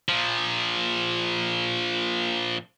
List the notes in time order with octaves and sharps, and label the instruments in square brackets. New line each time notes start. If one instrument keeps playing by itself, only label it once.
[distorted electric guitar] A#2 F3